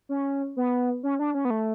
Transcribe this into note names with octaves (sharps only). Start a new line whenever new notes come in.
C#4
B3
C#4
D4
C#4
B3
A3